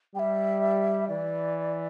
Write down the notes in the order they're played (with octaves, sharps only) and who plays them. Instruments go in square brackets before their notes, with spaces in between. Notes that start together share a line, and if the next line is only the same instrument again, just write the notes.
[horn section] G3 [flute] G5
[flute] E5
[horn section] E3 [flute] D5